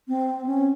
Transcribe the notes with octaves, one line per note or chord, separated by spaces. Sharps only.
C4
C#4